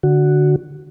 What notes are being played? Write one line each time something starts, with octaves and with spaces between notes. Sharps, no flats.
D3 F#4